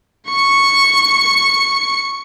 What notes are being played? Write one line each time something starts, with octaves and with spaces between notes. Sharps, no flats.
C#6 C#7